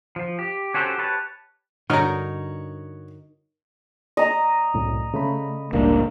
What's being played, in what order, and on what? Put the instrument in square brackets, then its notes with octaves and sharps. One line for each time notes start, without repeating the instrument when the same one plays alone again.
[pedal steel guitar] F3
G4
C#4 F#4 G4 A4 C5
G4 B4 C#5 A5
[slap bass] G2 D3 [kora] D#4 A#4 [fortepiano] F#4 C#5 F6
[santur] D#5 A#5
[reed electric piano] C2 F#2 A2
C#3 A3 B5
[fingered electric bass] F#1 C#2 A2 [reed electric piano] G3 D4 [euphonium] A#3